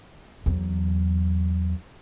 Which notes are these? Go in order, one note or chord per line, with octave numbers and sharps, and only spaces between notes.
E2 F#3